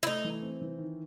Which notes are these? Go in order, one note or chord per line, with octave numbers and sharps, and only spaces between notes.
E4
A3 D#4
E3
C4
E3
D#3